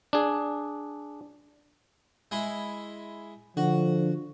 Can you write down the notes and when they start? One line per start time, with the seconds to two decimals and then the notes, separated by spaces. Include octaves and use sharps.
0.13 D4 G#4
2.31 G#3 E4
3.57 D3 F3 F#4